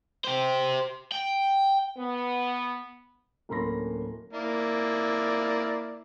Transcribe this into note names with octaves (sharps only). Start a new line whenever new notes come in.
G4 C5
G5
B3
D1 A#3 C#4 B5 C6 A#6
A#3 E4 D5